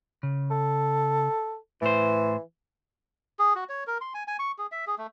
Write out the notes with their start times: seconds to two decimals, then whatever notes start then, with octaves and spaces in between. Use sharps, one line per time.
0.23 C#3
0.51 A4
1.82 A2 E3 C5
3.39 G#4
3.56 F#4
3.69 C#5
3.87 A#4
4.01 C6
4.14 G#5
4.28 G#5
4.39 C#6
4.58 G#4
4.72 E5
4.87 G#4
4.98 A3